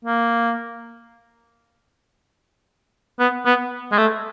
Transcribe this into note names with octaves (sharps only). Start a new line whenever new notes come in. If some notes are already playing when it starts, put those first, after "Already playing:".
A#3
B3
B3
G#3
A3